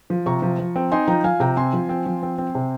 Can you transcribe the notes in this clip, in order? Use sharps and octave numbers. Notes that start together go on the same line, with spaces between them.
F3
C3 A#5 C#6
F3
F3
C4
D#4 G#5 C6
F3 G5 A#5
F3 F5 G#5
C3 G5 A#5
C4 G#5 C6
F3
C4
F3
C4
C4
C3